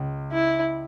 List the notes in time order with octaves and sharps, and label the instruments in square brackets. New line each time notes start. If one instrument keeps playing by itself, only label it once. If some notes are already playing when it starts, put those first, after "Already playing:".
Already playing: [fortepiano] C#2
[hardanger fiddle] E4